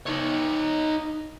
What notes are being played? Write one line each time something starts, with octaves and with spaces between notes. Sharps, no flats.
D#4 C#5